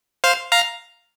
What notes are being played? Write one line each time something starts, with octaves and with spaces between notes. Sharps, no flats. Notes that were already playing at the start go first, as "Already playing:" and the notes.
C5 F5
F5 A#5